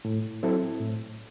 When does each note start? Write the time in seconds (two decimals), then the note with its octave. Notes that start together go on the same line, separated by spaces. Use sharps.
0.05 A2
0.43 F#3 C4 E4 A4
0.80 A2